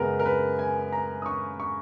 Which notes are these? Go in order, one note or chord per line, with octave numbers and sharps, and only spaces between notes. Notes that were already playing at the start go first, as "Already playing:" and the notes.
Already playing: F#2 C#3 G#3 B3 A#4 B4
A#4
B4
G#5
A#5
D#6
C#6
C#6